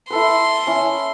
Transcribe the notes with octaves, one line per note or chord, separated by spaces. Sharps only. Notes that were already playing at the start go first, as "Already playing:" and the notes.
E4 A4 B4 C6
C#4 E4